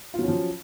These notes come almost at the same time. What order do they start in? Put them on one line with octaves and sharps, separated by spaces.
F4 F#3 C#4 F3